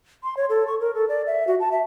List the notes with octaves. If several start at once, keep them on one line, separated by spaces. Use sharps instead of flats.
C6
C#5
A4
C#6
A#4
A4
D5
E5
F#4
A5
E5